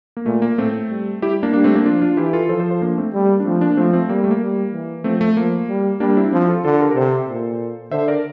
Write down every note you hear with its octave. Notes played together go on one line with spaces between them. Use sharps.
A#3
A#2 A3
A#3
A2 A3 C4
G3
G3 E4 G4
A#3 D4
G3 A#3 D4
A3 C4
A#3 D4
F3 D4 F4
D4 F4
E3 E4 G4
F4 A4
F3 A4 C5
A4 C5
A4 C5
A#3 D4
A3 C4
G3 A3
A#3
D4
F3 A3 C4
A#3 D4
F3 A3 C4
A3 C4
G3 A#3
A3
A#3
G3
E3
F3 A3 C4
A3
F3 A#3
G3
G3 A#3 D4
C4 E4
D4
F3 C4 E4
F4 A4
D3 F4 A4
G4 A#4
A#4
C3 A4 C5
A#2
D3 C5 E5
A#4 D5